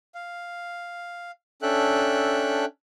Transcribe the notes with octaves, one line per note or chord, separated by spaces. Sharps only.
F5
C#4 D4 A4 E5 G5 F#6